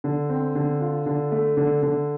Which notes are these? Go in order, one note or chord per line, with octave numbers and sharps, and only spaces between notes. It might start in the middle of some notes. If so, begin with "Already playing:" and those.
D3
C4
D3
F4
D3
A3
D3
D3